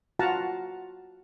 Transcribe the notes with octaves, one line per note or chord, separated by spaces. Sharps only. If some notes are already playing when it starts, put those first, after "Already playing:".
F4 F#4 F5 F#5 A5 A#5